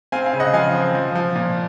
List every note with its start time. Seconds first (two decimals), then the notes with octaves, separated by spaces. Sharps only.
0.12 C4 F5 G#5
0.26 F5 G#5
0.33 C#3
0.40 D#5 F#5
0.53 F3 F5 G#5
0.75 C4
0.95 F3
1.15 F3
1.36 A#2